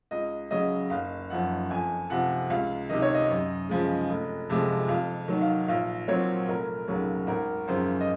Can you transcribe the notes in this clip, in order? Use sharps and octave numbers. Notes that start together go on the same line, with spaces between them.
C#2 D#5
C#3 F#3 D#5
F#1 F5
F#2 F3 F#5
F2 G#5
C3 F3 F#5
C#2 F5
C3 D#3 D#5
C#5
D#5
F#2
C#3 F3 G#3
F1
F2 C3 F3 G#3
F2 F5
D#3 F#3
F5
A#1 F5
A#2 F#3 C4 C#5
F1 A#4
D#2 C#3 F#3
G#1 A#4
F#2 C#3 F3 C5
D#5